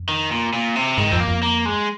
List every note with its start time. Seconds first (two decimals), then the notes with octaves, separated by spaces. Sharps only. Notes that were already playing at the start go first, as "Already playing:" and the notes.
Already playing: F2
0.09 D#3
0.31 A#2
0.53 A#2
0.76 C3
0.98 G#2 D#3
1.12 F2 C4
1.20 A#3
1.28 F2
1.43 A#3
1.66 G#3